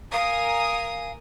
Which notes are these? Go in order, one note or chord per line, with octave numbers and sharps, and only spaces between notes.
A#4 F5 G#5 D#6